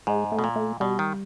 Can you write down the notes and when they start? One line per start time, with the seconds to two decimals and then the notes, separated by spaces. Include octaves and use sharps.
0.07 G#2 G#3
0.32 A3
0.39 B2
0.44 A#2
0.56 A3
0.80 B2 G3
0.99 D#3